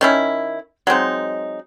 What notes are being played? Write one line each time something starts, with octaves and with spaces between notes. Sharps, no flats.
D#3 C#4 E4
F#3 G#3 C4 D#4